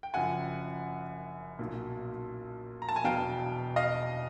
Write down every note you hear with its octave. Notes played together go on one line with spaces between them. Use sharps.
G5
F#1 F#2 C#3 F3 F#5 G#5
B1 A#2 F#3
A#5
A5
G#5
E1 E2 B2 F#3 F5 G5
D#5 F5